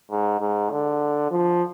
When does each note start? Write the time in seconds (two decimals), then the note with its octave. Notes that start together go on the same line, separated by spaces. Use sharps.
0.11 G#2
0.40 G#2
0.71 D3
1.31 F3